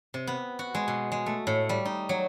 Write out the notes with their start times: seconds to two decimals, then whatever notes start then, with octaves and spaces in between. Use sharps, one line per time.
0.14 C3
0.27 B3
0.59 F#4
0.75 G#3
0.88 B2
1.12 G#3
1.26 A3
1.47 A2
1.69 G3
1.85 D#4
2.09 F#3